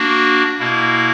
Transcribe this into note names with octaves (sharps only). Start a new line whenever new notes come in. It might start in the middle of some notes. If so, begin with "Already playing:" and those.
Already playing: A#3 D4 F#4
B2 A#3 E4